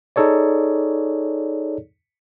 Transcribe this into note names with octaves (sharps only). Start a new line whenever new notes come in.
D#4 G#4 A4 C#5 D5